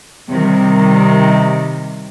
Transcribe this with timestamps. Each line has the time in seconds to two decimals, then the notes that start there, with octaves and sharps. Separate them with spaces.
0.29 C3 D#3 G3